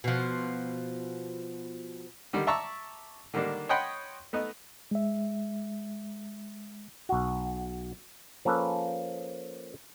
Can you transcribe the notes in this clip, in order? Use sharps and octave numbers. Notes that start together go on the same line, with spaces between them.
B2 F3
D3 D#3 G3
D5 E5 A5 A#5 C#6 E6
D3 D#3 G3 A#3 D4
C#5 D#5 F#5 G5 B5 C6
A3 B3 D#4
G#3 E5
B1 F#4
F3 A#3 C#4 A4 B4